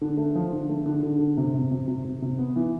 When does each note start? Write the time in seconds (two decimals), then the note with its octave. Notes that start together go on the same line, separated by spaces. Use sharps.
0.01 D3
0.17 A3
0.35 F3
0.52 D3
0.69 A3
0.86 D3
1.03 D3
1.19 D3
1.37 C3
1.54 C3
1.71 C3
1.88 C3
2.05 C3
2.22 C3
2.38 B3
2.56 E3